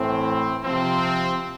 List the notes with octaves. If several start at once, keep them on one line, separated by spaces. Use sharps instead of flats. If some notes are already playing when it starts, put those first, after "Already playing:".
Already playing: A2 E3 C4
C3 F3 C4